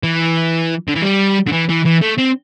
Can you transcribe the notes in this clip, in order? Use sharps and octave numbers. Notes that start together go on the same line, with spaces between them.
E3
D3
E3
G3
D3
E3
E3
E3
A3
C4